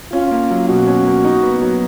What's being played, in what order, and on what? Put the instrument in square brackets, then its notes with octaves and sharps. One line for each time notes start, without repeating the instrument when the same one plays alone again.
[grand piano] C#4 [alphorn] F4
[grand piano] A#3
F#3
[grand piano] B2 [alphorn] F#4
[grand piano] C#4
A#3
D#4
B3
F#3